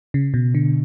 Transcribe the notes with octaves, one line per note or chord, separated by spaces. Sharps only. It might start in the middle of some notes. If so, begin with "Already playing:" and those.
C#3
B2
D3